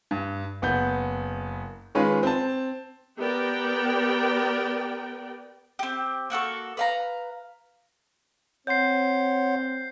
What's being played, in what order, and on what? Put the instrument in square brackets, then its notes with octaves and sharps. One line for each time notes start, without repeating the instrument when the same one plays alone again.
[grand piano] G2
F#1 B3 F#5 G6
D#3 G#3 C#4 F4 B4
C4 A5
[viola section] B3 G4 A#4 D5 G5
[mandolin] C4 G4
A#3 F#4 A4 C#6
B4 F5 A#5
[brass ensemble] C4 [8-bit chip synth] C#5 F#5 C6 [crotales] G6 C7